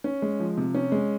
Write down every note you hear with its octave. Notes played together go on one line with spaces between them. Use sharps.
C#4
G#3
F3
C3
C#4
G#3